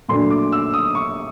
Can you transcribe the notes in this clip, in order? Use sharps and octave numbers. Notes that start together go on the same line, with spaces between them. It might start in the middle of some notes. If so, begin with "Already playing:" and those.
A#2 F#3 A3 D4 C6
D6
E6
D#6
C#6